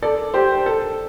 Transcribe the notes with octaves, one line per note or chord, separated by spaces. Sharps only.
A4 D5
G4 C5
A4